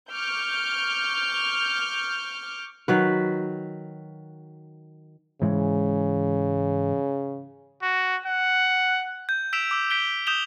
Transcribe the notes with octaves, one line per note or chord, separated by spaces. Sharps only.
C#6 D6 F6 G6
D#3 F#3 B4
G#2 C#3 E3 G#3
F#4
F#5
G6
E6 B6 D7 E7 F7
D6 E6
G6 B6 D7 G7
D#6 G6 E7 F7 G7